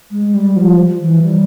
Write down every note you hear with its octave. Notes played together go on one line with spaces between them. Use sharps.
G#3
G3
F3
E3
G3